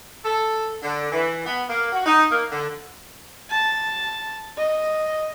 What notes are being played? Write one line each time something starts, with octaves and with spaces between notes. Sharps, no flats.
A4
D3
E3
B3
A#3
F#4
D#4
A#3
D3
A5
D#5